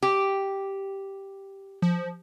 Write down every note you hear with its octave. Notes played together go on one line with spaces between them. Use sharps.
G4
F3